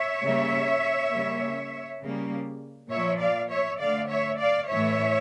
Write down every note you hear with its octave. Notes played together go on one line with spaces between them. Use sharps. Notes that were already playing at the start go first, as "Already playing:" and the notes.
Already playing: C#5 E5
C#3 G3 A#3
C#3 G3 A#3
C#3 G3 A#3
A#2 F3 A#3 C#5 E5
D5 F5
C#5 E5
D3 A3 D5 F5
C#5 E5
D5 F5
A2 E3 A3 C#5 E5